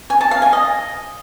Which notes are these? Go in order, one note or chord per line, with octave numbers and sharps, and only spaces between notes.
G#5
A5
F5
G#5
D#5